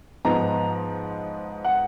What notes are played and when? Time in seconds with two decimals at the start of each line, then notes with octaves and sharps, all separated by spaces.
0.25 G#2 F3 B3 D#4 A#5
1.64 F#5